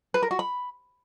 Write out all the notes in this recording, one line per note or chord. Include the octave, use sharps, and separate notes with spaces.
B4
A#4
F#4
B5